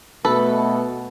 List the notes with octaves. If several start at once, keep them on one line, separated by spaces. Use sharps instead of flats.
B2 A3 A4 B4